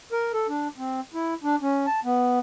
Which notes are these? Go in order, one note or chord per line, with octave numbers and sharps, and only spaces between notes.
A#4
A4
D4
C4
E4
D4
C#4
A5
B3